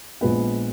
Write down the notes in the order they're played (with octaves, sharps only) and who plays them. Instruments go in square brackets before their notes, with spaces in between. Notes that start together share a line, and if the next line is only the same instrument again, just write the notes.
[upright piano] A#1 A#2 G#3 B3 B4